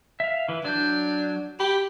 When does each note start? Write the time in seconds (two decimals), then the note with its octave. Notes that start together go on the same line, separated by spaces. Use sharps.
0.20 E5 F5
0.49 E3 B4
0.64 F#3 D4 G6
1.60 G4 B5